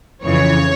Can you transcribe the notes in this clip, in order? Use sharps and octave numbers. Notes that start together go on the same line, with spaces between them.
F2 C#3 E3 C#5